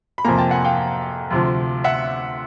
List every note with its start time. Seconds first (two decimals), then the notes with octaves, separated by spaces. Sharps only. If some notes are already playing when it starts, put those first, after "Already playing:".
0.18 B5
0.25 F2 C3 F3 A#3 G#5 A#5
0.38 G5 A5
0.51 F#5 G#5
0.64 F5 G5
1.30 D2 C3 F3
1.84 E5 F#5